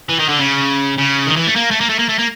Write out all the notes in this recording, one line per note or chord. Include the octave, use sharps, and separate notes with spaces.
E3
D#3
D3
C#3
C#3
D#3
E3
A3
A#3
A3
A#3
A3
A#3
A3
A#3